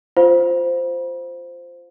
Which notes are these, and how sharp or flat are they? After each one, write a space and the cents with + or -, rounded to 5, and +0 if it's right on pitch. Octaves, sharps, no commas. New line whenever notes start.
F4 +0 C5 -5 F5 +30